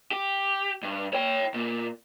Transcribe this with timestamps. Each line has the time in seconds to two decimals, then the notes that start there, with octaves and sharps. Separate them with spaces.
0.11 G4
0.83 G2
1.13 C#5 G5
1.54 A#2